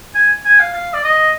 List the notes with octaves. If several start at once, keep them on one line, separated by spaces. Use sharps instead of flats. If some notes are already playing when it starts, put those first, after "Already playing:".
G#5
G#5
F5
F5
D5
D#5